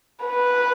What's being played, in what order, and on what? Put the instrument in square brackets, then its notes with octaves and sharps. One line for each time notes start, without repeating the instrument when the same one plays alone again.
[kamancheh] B4